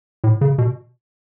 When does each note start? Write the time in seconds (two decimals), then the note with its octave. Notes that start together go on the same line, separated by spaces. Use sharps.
0.24 A2
0.41 C#3
0.58 B2